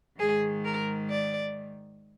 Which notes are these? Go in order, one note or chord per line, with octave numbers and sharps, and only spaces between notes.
G#2 D#3 G#4
A#4
D5